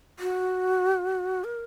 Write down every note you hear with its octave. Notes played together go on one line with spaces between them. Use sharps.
F#4
A#4